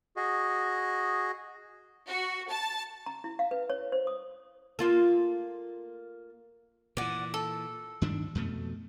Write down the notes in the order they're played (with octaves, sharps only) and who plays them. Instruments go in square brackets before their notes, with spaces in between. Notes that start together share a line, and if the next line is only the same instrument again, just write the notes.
[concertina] F#4 G#4 D#5
[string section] F#4
A5
[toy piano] A#5
E4
F5
B4
C#5
C5
D#6
[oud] A#3 F4 A4
[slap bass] A#2 E3 [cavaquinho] D5 F#5
[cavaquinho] A4
[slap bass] G2 D#3 D4
F2 B2 A3